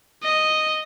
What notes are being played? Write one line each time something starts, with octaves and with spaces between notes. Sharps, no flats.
D#5